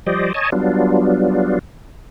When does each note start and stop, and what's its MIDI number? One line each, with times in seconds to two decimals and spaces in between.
0.07 0.33 53
0.07 0.33 55
0.07 0.33 67
0.07 0.33 72
0.07 0.33 74
0.07 0.33 75
0.34 0.50 73
0.34 0.50 75
0.34 0.50 80
0.34 0.50 81
0.52 1.59 54
0.52 1.59 55
0.52 1.59 59
0.52 1.59 62
0.52 1.59 65